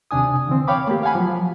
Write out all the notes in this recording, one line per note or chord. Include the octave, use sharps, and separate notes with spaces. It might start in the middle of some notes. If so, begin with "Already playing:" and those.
D#2 C3 D4 G#5 D#6
D3 E3 C4
C#5 F5 G5 B5 D6
A3 A#3 G4
F5 F#5 G#5 B5
F3 F#3